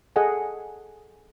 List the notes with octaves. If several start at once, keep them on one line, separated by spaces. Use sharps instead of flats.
G#4 A4 D#5 F#5 G#5